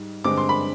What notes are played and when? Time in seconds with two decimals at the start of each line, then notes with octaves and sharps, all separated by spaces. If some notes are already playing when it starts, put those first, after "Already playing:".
Already playing: G#2 G3
0.24 G2 D3 G#3 C4 D6
0.37 C6
0.49 B5